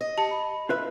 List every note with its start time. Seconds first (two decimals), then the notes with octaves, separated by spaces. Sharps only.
0.01 D#5
0.18 G4 A5 C#7
0.31 B5
0.69 F4 B4 E5